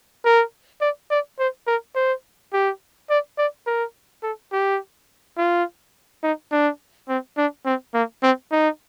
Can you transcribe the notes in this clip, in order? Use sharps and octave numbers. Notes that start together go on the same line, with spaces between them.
A#4
D5
D5
C5
A#4
C5
G4
D5
D5
A#4
A4
G4
F4
D#4
D4
C4
D4
C4
A#3
C4
D#4